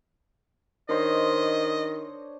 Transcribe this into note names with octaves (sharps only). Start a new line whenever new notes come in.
D#3 D4 C5 C#5 D#5